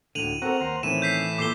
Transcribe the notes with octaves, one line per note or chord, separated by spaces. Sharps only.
D2 A2 D3 D#7 F7 F#7
C4 F#4 A4 A#4 F#5
D#2 A#4 C5 F#5
A2 D#3 E3 C4 C#4 D#7 E7
G6 B6 C7
A#2 A3 D6 C7 G7